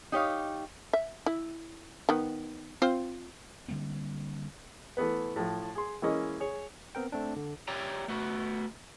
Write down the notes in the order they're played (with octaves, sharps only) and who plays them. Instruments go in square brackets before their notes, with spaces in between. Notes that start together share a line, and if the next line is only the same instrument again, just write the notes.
[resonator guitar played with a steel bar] D#4 G4 C#5 F5
[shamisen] E5
E4
D#3 B3
C4 F4 C5
[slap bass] D3 G3 A#3 C4
[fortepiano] E3 A3 B3 B4
A2 F3
G#4 C6
E3 G#3 A#3 C#4 D#5
G#4 C#5
[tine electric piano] B3 C4 A#4 G5
A3 C4 D4
D3
[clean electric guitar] G4 C#5 D5 E5 G5 A#5
A3 B3 F#4